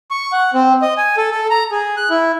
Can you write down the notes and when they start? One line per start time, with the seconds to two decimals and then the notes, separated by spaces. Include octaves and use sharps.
0.11 C#6
0.32 F#5
0.54 C4
0.82 D#5
0.97 G#5
1.17 A4
1.31 A4
1.50 A#5
1.71 G#4
1.97 F#6
2.10 E4